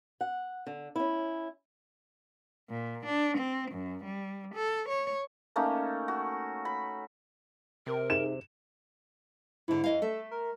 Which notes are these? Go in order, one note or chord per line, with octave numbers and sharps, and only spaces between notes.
F#5
D3
C#4 E4
A#2
D4
C4
F#2
G3
A4
C#5
A3 A#3 C#4 D#4
F#4
B5
C3 A#4
D#4 G#4 E5 E7
G#2 D3 E4
F2 D#5 F5
A3 A4 E5
A#4